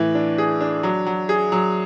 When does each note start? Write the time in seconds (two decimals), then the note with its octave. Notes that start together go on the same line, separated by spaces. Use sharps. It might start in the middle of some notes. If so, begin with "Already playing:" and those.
Already playing: A2 E3
0.15 D4
0.38 G#4
0.61 D4
0.83 F#3
1.06 F#3
1.29 G#4
1.52 F#3